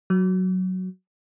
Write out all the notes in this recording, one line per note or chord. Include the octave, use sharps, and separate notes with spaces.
F#3